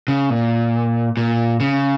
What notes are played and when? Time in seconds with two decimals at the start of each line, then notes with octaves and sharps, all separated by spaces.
0.08 C#3
0.30 A#2
1.17 A#2
1.60 C#3